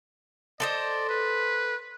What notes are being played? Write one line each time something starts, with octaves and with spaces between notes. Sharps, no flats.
A4 C5 D5 D#5
B4